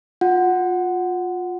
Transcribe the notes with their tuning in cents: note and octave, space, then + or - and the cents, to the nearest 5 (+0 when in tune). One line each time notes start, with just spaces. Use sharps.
F4 +25 F#5 +0